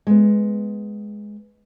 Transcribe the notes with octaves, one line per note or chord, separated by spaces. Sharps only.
G#3 B3